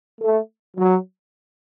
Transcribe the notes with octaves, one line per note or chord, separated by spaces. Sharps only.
A3
F#3